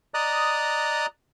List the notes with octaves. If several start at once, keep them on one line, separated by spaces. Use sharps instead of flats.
D5 D#5 A#5 D#6 F#6